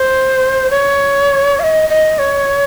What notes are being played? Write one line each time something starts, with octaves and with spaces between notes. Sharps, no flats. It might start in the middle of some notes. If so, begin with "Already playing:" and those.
Already playing: C5
C#5
F5
D#5
D#5
C#5